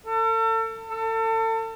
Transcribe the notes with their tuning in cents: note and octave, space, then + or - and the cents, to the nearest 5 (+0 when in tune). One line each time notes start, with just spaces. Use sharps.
A4 +40
A4 +35